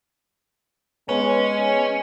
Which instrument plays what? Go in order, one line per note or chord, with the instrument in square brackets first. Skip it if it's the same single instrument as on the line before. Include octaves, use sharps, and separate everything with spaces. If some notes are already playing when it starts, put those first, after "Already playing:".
[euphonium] G#3 [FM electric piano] B3 B4 [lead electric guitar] C#4 [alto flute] C#5